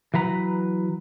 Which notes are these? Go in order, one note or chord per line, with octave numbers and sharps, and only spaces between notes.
E3 F#3 B4 A#5